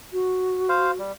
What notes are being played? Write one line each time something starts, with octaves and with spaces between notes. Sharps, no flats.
F#4
C5 F5
G3